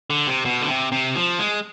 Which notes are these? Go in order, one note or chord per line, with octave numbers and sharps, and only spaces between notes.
D3
C3
B2
D3
C3
C3
F3
G#3